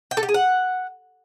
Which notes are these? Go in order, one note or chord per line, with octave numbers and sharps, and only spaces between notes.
G5
A4
G4
G#4
F#5